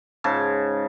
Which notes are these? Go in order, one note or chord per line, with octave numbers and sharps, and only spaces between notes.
G#2 C#3 A5